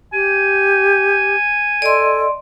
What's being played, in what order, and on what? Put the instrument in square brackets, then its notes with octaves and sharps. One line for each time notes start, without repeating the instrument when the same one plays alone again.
[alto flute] G4 [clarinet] G#5
[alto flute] A4 [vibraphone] D5 D#5 C6